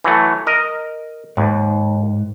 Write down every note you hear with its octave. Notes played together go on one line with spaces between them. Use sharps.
E3 F#3 A3
A#4 D#5
D#2 G#2